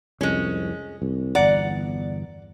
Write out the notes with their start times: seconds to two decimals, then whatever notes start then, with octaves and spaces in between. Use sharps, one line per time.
0.21 C2 F2 G#3 C#4
1.02 C2
1.35 G1 E2 D5 F#5 A#5